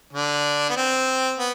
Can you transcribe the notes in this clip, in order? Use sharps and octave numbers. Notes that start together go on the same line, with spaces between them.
D3 D4
B3
C4
B3